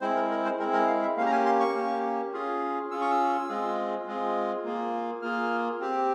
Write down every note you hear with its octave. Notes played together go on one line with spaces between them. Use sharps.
G#3 C4 E4 C5
A#4
A#4
C5
G#3 C4 E4 A#4
A#4
F5
E5
A#3 C#4 G4 F5
A#5
G#5
C6
C#6
A#3 C#4 G4
C#4 F4 G#4
C#4 F4 G#4 E6
C#6
E6
G#3 C4 F4 G#4
G#3 C4 F4 G#4
A#3 F4 G#4
A#3 F4 G#4 F6
C4 G4